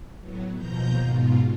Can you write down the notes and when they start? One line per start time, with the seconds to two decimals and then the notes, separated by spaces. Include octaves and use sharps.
0.21 A2 F#3 B3
0.54 D#2 B2 F3 A#5 G6
0.99 G#2 B2 F4